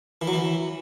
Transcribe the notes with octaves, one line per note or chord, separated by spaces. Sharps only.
E3
F#3
E3